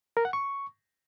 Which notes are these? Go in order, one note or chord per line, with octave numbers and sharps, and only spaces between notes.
A#4
F#5
C#6